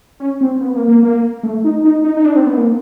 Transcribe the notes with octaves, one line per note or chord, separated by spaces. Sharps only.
C#4
C4
B3
A#3
A#3
A#3
A3
D#4
D#4
D#4
D#4
D4
C4
B3
A#3